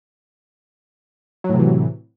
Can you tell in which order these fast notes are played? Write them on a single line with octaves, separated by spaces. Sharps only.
F#3 A2 C3 E3